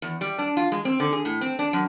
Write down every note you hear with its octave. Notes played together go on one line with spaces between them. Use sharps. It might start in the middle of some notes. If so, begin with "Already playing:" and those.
E2
G3
D4
F4
G#3
C4
D3
G#4
A2
C4
D4
F#2